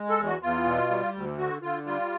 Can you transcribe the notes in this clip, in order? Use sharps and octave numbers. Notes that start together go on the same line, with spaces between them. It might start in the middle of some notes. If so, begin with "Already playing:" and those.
Already playing: G#3
A4
E2
F#4
E2 F4
B2
G3
D2
D3 F#4
D3 F4
G3 F4